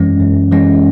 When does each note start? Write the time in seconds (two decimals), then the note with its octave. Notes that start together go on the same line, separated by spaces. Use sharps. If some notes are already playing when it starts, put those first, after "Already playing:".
Already playing: F#2 E3 G#3 C#4
0.20 F#2
0.52 E3 G#3 C#4